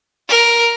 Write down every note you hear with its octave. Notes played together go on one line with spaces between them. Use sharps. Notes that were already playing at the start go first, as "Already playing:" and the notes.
A#4